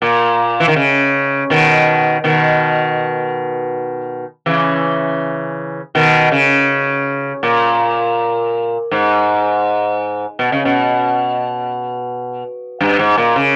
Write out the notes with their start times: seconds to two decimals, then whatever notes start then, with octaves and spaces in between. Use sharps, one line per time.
0.02 A#2
0.60 E3
0.68 D#3
0.76 C#3
1.50 B2 D#3
2.24 B2 D#3
4.46 C#3 E3
5.95 B2 D#3
6.32 C#3
7.43 A#2
8.91 G#2
10.39 B2
10.52 C#3
10.65 B2
12.81 G2
12.99 G#2
13.18 A#2
13.36 C#3